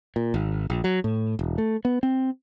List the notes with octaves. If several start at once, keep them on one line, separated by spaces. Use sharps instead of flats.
A#2
G#1
A#1
F#3
A2
E1
A3
B3
C4